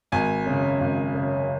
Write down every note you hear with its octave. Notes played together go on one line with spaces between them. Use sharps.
G#1 G#5
F#2 C#3
G#1
F#2 C#3